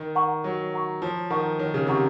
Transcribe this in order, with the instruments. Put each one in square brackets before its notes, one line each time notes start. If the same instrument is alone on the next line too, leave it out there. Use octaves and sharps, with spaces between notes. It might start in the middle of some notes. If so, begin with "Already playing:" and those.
Already playing: [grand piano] D#3
[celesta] F#5 A#5 C#6
[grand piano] F#3 [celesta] C#5
[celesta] F#5 A#5 C#6
[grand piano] F3 [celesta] C#5
[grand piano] D#3 [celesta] F#5 A#5 C#6
[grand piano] D#3 [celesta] C#5
[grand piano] C#3
[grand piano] C3 [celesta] F#5 A#5 C#6